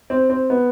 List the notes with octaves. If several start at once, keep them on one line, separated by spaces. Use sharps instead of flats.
C4
C4
B3